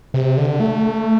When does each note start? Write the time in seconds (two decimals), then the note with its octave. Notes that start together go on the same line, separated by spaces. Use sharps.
0.14 C3
0.38 D3
0.60 A3